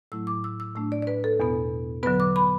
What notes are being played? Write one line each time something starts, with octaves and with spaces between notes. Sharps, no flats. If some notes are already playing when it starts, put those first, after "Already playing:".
A2 F#3 A3 E4 E6
D6
E6
E6
A2 A3 D4 E6
D5
D5
B4
A4
E2 B2 B3
D3 F#3 B3 B4
D6
B5